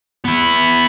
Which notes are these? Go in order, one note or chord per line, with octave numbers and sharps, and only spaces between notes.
B3 E4